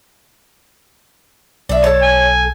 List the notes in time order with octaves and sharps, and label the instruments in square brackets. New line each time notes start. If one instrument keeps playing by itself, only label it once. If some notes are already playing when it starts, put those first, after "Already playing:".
[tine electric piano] B1 [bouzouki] D4 E5
[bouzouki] A4 A5 [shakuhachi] C#5
[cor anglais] G#5